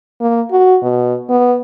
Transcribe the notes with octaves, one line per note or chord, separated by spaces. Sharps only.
A#3
F#4
B2
B3